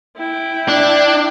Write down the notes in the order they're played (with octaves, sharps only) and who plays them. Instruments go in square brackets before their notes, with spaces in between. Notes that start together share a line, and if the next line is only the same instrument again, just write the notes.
[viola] E4 G5
[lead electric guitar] D4